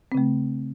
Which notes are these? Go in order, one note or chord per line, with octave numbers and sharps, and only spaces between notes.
C#3 A3 C4